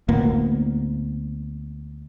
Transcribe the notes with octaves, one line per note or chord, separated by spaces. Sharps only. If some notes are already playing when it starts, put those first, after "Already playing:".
D2 A2 A#3 B3